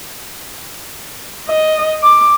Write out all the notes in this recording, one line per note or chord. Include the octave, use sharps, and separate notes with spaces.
D#5
D6